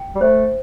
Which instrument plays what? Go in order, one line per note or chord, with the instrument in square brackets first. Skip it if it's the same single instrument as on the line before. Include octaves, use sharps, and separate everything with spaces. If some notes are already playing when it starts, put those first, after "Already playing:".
Already playing: [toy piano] G5
[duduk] G3
[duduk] A3 [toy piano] C5